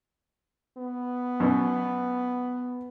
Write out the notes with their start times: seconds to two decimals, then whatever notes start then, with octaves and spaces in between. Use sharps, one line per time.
0.78 B3
1.40 F#2 B2